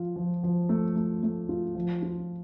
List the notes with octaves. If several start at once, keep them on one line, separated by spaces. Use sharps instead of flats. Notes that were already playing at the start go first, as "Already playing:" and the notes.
Already playing: F3 F4
F3
F3
A3
A3
A3
F4
F3
F4